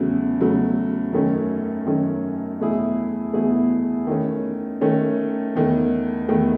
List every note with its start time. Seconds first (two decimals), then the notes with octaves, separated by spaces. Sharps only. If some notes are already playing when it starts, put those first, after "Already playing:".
Already playing: E2 C#3 F#3 A3
0.39 E2 C#3 F#3 A3
1.12 F#2 D#3 A3 C#4
1.86 F#2 D#3 A3 C#4
2.59 E2 B2 A3 E4 G#4
3.33 E2 B2 A3 E4 G#4
4.07 D#3 A3 C#4
4.81 D#3 A3 C#4
5.55 E2 D#3 A3
6.29 E2 D#3 A3